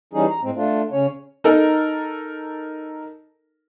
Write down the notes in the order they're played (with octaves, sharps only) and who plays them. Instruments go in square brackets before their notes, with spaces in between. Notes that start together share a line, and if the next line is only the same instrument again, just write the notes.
[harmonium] E3 G3 C#4 D#4 G#4
A#5
A2 G#3 C4
A3 D4 F4
C#3 C#4 C#5
[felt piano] D#4 A4 A#4